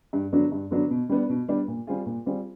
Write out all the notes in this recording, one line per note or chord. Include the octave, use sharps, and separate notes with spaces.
G2
D3 F#3 B3 D4
G2
D3 F#3 B3 D4
B2
G3 B3 D4
B2
G3 B3 D4
A#2
G3 C4 F4 G#4
A#2
G3 C4 F4 G#4